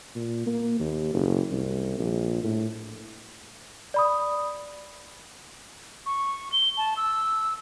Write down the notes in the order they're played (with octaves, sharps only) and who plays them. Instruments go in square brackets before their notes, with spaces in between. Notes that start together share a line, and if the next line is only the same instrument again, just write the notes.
[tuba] A#2
A#3
D#2
F#1
C2
A#1
A2
[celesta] D5 B5 D#6
[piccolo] C#6
G7
A5
E6